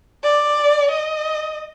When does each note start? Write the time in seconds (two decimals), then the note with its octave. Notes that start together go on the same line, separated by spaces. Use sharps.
0.24 D5
0.91 D#5